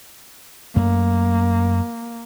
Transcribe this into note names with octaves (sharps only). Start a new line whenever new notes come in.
F#2 A3 A#3